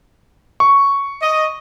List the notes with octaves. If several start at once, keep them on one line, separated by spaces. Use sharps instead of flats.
C#6
D#5